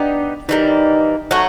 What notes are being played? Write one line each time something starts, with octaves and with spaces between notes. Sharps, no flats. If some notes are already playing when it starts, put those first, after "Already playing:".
Already playing: B3 D4 D#4 G4
E3 G3 A#3 D#4
F#3 A3 C#4 F#4